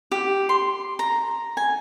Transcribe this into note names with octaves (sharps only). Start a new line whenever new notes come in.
G4
C6
A#5
G#5